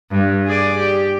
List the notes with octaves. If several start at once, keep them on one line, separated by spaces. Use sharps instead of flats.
G2
G#4 D5
G4